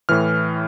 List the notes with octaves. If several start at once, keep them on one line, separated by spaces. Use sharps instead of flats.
A2 E3 F6